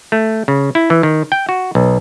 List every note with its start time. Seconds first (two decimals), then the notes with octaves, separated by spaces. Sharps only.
0.12 A3
0.48 C#3
0.75 E4
0.90 E3
1.03 D#3
1.32 G5
1.49 F#4
1.75 B1